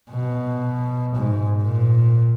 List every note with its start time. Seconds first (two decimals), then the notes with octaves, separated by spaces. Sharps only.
0.11 B2
1.15 G#2
1.62 A#2